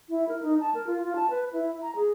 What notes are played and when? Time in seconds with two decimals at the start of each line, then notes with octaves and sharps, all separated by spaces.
0.09 E4
0.29 A#4
0.42 D#4
0.60 A5
0.74 A#4
0.87 F4
1.02 F4
1.16 A5
1.30 B4
1.53 E4
1.82 A#5
1.96 G#4